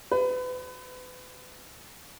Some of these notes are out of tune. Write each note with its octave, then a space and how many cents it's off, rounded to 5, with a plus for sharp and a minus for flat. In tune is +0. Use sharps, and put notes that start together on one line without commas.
B4 +35